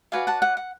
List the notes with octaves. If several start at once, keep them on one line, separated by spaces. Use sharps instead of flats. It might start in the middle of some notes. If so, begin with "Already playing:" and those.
F#4 B4 D5 F5 G#5
F#5 A5
F#5
F#5